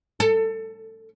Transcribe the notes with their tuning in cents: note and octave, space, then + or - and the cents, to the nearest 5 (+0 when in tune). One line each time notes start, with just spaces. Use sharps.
A4 +20